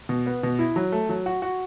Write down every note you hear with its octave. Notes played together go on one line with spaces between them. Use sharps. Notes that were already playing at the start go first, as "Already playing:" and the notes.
B2
B3
B2
E4
F#3
A3
F#3
F#4
F#4